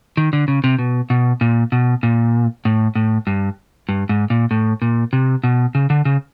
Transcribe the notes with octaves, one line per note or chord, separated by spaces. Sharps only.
D#3
D3
C#3
C3
B2
B2
A#2
B2
A#2
A2
A2
G2
G2
G#2
A#2
A2
A#2
C3
B2
C#3
D3
C#3